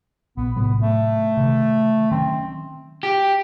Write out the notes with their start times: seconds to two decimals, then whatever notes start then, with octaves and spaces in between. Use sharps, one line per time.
0.37 A#1 B3
0.56 A2 C3 F#3 B3
0.82 A3
1.37 C3 D#3 E3
2.11 D#3 F#3 C4 C#4
3.03 G4